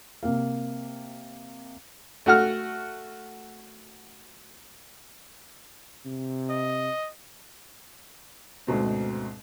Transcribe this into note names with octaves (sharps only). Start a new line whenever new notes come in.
C3 A#3 F5
A3 F#4 F#5 F6
C3
D#5
D2 G#2 B2 C4